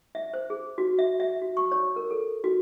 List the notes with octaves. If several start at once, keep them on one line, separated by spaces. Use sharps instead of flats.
E5
C5
G#4
F#4
E5
E5
F#4
C#6
C#5
A#4
A4
F#4